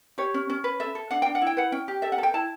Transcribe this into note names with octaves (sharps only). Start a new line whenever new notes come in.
G4 C#5
C#4
C#4
B4
A4 E5
A4
D4 F#5
D4 G5
F#5
E4
G5
B4 F#5
C#4 G5
G4
A4 E5
F#5
A4
G5
E4 A5